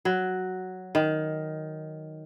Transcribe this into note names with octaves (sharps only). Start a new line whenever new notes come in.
F#3
D#3